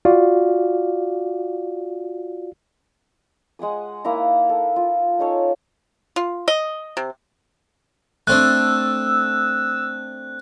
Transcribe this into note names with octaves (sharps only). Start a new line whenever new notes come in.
F4 F#4 D5 F5
G#3 F#5 G#5 D#6
A#3 D#4 E4 A#5
A4
F4
C#4 D#4 A4 C#5
F4
D#5
C3
A3 C4 D4 E6 F#6